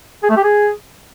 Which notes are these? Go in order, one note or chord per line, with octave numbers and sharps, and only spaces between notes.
G#4
A3
G4
G#4